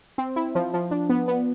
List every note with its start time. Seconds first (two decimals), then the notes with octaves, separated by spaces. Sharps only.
0.18 C4
0.36 E4
0.55 F3
0.74 F3
0.91 D4
1.10 B3
1.28 B3